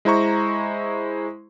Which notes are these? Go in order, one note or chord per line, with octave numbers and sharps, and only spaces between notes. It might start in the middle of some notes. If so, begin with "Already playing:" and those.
G#3 E4 C5 A#5 C#6